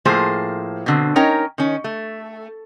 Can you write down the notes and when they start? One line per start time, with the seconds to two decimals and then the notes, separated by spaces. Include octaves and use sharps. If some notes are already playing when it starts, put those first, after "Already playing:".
0.05 A2 F3 A3 A#3 G#4 C5
0.86 B2 D3 C4
1.16 C#4 D#4 A#4 C#5 G5
1.58 D#3 C#4
1.84 A3